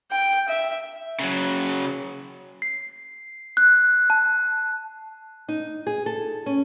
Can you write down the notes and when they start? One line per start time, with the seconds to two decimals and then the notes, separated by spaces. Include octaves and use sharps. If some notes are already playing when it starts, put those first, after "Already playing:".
0.11 G5
0.49 E5
1.20 C#3 F#3
2.62 C7
3.57 F#6
4.10 A5
5.49 D#4
5.87 G#4
6.06 A4
6.46 C#4